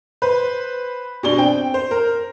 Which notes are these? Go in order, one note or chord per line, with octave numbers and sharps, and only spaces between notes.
B4 C5
B2 D4 D5 G7
C4 G5
C5
A#4